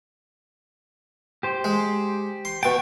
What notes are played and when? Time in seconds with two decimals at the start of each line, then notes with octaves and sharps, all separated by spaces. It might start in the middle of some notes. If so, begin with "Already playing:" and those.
1.43 G4 C5
1.64 G#3
2.45 C6
2.63 B2 G5 A5 C#6